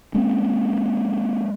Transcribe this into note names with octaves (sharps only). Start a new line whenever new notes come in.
G#3 A#3 C4 C#4